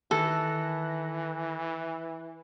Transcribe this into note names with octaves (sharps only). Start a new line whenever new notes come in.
D#3 E3 A4 F#6 A#6